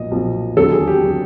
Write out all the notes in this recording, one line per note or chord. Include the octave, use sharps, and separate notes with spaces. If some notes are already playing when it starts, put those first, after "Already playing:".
Already playing: B1 A#2 F3 D#5
B1 A#2 F3
E1 D#2 D3 F#3 A4
G#4
G4
D3 F#3